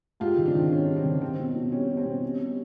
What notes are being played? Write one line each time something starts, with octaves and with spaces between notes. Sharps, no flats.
G#2 F4 G4
D#3
C4 D4
D#3
G3 C#4
G3
C4
D#3
G3 C4
B2
B2
G3 C#4
G3
C4
B2
G3 C#4
G3